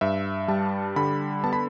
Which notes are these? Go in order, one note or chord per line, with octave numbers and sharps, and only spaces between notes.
G2 E5
G3 A5
D3 B5
B3 A5
B5